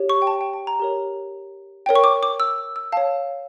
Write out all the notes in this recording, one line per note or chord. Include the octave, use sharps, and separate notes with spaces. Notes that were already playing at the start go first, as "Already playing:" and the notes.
Already playing: G4 C#5
C#6
G5
A5
G5
A5
A#5
G4 A#4 C#5
A#4 C#5 G5
C#6
D6
D6
E6
E6
C#5 F5 A5